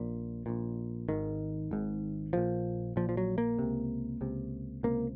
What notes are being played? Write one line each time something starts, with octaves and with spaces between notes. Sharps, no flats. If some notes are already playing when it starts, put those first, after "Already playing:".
Already playing: A#1 A#2 F3
A#1 A#2
G#1 G#2 D#3
G#1 G#2
A#1 A#2 F3
A#1 A#2 F3
F3
F#3
A#3
C#2 C3
C#2 C3
C#2 C3 A#3